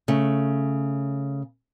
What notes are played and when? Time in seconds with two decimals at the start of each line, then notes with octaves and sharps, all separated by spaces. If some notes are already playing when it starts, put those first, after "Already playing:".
0.08 C#3 A3